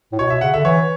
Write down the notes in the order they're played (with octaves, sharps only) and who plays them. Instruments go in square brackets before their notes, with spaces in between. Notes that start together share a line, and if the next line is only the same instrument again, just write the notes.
[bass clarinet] A2
[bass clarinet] B2 [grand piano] C#5
[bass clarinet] B2 [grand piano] E5
[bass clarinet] C#3 [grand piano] F#5
[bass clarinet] D3 [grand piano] E5
[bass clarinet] E3 [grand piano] C#5